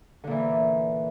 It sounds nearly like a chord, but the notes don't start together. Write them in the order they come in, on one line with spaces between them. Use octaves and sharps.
D3 A#2 E3